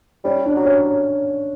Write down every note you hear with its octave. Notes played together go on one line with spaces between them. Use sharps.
G3 C#4
D4
F#3
C#4